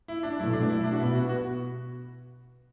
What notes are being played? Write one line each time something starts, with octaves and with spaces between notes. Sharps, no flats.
E4
D4
B2 F#3 A3 E4
D4
E4
D4
F#4
B2 B3 E4
F#4
F#4